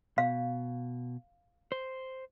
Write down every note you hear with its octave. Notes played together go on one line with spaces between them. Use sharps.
B2 F5
C5